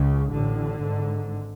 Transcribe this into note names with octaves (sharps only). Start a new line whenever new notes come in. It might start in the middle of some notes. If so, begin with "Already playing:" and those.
Already playing: C#2 C#3
A1 A2 D3
G#1 G#2